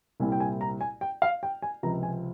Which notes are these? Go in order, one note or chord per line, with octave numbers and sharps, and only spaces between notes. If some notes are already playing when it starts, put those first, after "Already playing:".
C2 A#2 G3 C4 E4 G#5
G5
G#5
A#5
G#5
G5
F5
G5
G#5
C#2 C3 F3 C4 A#5
G#5